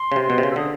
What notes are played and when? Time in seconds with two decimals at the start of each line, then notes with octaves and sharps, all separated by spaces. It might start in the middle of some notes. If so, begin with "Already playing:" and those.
Already playing: C6
0.12 C#3
0.16 C3
0.30 B2
0.38 C3
0.43 C#3
0.51 E6
0.56 D3 D#6